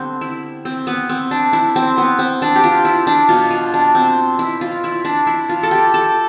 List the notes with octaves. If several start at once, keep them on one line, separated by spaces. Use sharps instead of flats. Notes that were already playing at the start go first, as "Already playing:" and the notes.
Already playing: D3 G3 B3 C4
E4
C4
B3
C4
D4
E4
C4
B3
C4
D4
G4
F4
E4
D4
B2 B3 F4
F4
D4
C4
E4
F4
E4
D4
E4
F4
A4
G4
A4